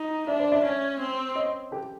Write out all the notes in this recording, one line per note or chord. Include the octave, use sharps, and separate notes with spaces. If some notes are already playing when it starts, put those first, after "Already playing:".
Already playing: D#4
D4 D5 E5
C5 D5
D5 E5
C#4
C4
C#5 D#5
G4 A4